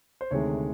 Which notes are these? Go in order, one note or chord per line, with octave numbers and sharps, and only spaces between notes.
C5
D2 C3 D#3 G#3 C#5